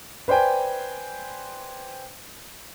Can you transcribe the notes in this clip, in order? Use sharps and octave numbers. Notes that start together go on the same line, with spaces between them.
B4 C5 D5 G5 G#5